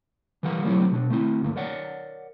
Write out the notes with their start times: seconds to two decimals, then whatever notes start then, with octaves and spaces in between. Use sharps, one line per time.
0.43 E3 G3 A#4 F5 F#5
0.64 F#3 A3 A#3 C4 E4 G4
0.92 B2 D4
1.10 A3 C4 E4
1.41 D2 G2 A3 A#3
1.56 A#4 C#5 D5 F#5